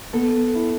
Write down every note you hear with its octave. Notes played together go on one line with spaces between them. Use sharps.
B3 A4
E4